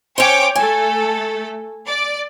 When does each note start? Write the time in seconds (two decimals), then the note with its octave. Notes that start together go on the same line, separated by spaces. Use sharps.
0.18 C#4 C5 C#5 G5 D6
0.56 A3 A4 G#5
1.86 D5